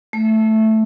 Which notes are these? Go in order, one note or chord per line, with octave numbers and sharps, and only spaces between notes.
A3